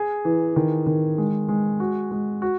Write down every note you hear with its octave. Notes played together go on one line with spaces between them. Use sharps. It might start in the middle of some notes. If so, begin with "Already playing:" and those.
Already playing: G#4
E3
D#3
D#3
G#3
G#3
F#4
G#3
F#4